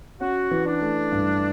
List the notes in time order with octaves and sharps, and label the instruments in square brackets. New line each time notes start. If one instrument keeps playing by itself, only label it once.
[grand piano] C#4 [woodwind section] F#4
[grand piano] E3
[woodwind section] D4
[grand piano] A3
G2